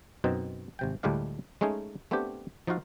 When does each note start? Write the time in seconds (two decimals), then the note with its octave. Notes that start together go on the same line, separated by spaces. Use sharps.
0.24 F#2 B2 C4 D#4
0.79 G#1 C3 G5
1.03 D2 A2 G3 G#3 D4 F5
1.61 G#3 A3 C#4 D#4 G#4
2.11 A3 B3 C4 D4 G4
2.67 F3 D#4 F4 F#4 F5